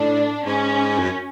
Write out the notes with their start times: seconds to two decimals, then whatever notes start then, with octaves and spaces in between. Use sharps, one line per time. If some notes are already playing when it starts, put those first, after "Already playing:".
Already playing: A2 D4
0.46 G#2 C#4
0.99 F#2